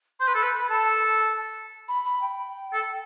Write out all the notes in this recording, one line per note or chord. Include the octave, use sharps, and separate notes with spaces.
C5 C6
B4
A4 B5
B4
B5
A4 A5
B5
B5
G5
A4